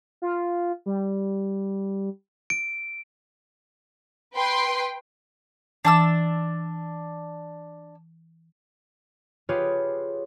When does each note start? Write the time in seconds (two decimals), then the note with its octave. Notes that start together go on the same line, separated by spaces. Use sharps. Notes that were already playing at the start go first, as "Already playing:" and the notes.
0.22 F4
0.86 G3
2.50 D7
4.33 B4 G5 C6
5.85 E3 D4 A5 D6 E6
9.49 F4 G4 G#4 B4 C#5